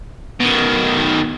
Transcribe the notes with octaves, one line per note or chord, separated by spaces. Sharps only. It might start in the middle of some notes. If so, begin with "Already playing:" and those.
B2 D#3